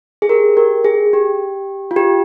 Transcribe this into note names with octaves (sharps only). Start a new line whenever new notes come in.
G#4
G4 A#4
G4 A#4
G#4
G4
F4
G4